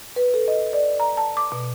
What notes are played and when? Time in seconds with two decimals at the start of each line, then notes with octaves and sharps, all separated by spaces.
0.16 B4
0.34 A4
0.48 D#5
0.73 D5
1.00 A#5
1.17 A5
1.37 D6
1.52 B2